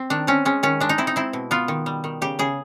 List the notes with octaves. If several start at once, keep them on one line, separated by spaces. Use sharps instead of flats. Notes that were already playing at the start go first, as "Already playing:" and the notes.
Already playing: C4
D#3 D4
C4 C#4
G#3 C#4
D#3 C#4
G#3 D4
D#4
C4 E4
D#4
C4 E4
B2
B3 F4
D#3
G3
D#3
C#3 G4
C#3 G#4